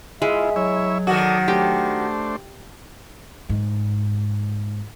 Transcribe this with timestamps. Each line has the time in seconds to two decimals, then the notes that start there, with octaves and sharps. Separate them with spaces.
0.22 G#3 E4 F4 E5
0.56 F#3 E4 C#5 E5
1.07 D#3 F#4 A4 D5 D#6
1.48 A3 D4 G4 C5
3.49 G#2